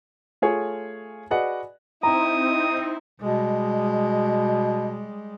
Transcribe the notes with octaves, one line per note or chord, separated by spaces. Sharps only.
A3 F4 G#4 C#5
F#4 G#4 B4 D5 D#5 F#5
C4 D#4 E4 A#5 D#6
B2 G3 G#3